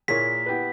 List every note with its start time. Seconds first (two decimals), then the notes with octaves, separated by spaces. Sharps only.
0.08 A#2 A#3 E4 G#4 C#5 B6
0.46 B3 E4 G4 B4